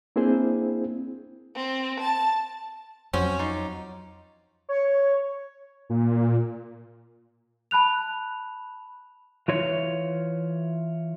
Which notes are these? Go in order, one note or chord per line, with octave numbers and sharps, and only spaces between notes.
A#3 C4 D4 E4 G#4 C5
C4
A5
F2 F#3 C#4 C5
D#4 F4 D5
C#5
A#2
A5 B5 F#6 F7
E3 F4 C#5